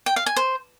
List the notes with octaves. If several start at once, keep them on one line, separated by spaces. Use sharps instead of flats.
G5
F5
G#5
C5